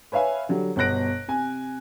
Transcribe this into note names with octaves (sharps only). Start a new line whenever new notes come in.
B4 C#5 E5 F5 G#5
D3 F#3 G3
G1 B2 B3 F#6 A#6 D7
C3 G#5